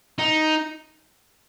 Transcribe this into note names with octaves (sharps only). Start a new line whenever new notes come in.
D#4